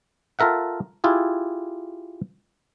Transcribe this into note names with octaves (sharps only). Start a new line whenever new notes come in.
F4 A4 A#4 E5 F#5
E4 F4 G4 G#4